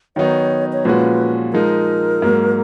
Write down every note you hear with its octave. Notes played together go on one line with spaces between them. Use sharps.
D#3 F#3 B3 D#4 C#5
C#5
A#2 F3 G#3 C#4 F#4 B4
F3 G#3 D#4 A#4
G#2 F#3 A#3